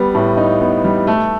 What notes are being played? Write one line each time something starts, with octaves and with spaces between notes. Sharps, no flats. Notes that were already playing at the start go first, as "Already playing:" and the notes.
Already playing: G3 B3
A2
D#4
B3
G3
A3